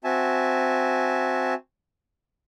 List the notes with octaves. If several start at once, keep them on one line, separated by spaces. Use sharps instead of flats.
C4 F#4 E5 G#5 A5